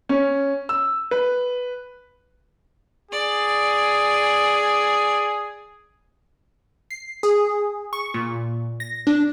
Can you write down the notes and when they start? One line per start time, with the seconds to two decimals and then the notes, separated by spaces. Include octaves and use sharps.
0.09 C#4
0.69 E6
1.11 B4
3.12 G#4 D5
6.91 C7
7.23 G#4
7.93 C#6
8.14 A#2
8.80 A#6
9.07 D4